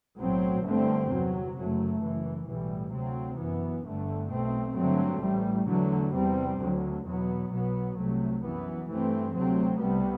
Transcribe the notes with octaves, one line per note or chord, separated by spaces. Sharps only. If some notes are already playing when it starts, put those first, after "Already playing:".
B1 A2 F#3 C4
G1 G2 D3 A3 C4
E2 C3 F#3
F#1 F#2 F#3 A3
F#1 F#2 E3
B1 A2 E3 G3
D2 C3 F#3 C4
F#2 E3 B3
G1 G2 D3 A3
B1 B2 A3 C4
G2 D3 F#3 A3 C4
A1 A2 G3
E2 D3 F#3 A3
E2 C3 G3 C4
D2 D3 F#3
E2 B2 F#3 B3
B1 B2 F#3 B3
C2 C3 F#3 A3
F#2 E3 B3
G2 E3 A3 C4
D2 C3 F#3 A3 C4
C2 C3 G3 B3